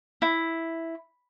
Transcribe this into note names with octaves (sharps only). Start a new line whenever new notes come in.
E4